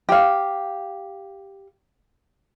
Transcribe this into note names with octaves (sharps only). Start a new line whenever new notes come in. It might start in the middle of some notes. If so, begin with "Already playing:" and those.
G4 F5